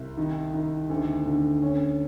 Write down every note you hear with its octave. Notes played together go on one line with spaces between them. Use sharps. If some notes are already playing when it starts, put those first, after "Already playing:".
Already playing: C2
D#3
D#3
D2
D3
C#4